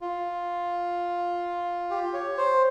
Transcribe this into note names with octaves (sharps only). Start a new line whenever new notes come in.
F4
G4
C#5
C5